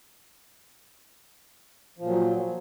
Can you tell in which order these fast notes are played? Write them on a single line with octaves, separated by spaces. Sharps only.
F3 A#2 F#3